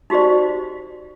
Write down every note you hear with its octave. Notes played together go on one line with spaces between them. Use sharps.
D#4 F#4 G4 C5 D5